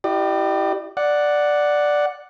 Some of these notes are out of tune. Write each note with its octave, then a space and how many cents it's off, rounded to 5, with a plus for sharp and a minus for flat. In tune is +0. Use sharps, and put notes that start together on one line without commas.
E4 +0 G4 -20 D5 +45
D5 +0 F#5 +0